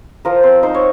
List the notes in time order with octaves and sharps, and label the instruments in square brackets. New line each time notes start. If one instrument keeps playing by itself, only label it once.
[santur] F3 A#4
C4
D#4 C5
C#5